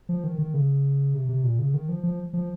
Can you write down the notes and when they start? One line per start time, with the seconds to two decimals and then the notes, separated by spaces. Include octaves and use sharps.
0.09 F3
0.24 D#3
0.38 D#3
0.54 C#3
1.14 C3
1.29 C3
1.44 A#2
1.59 C#3
1.74 D#3
1.89 F3
2.03 F3
2.33 F3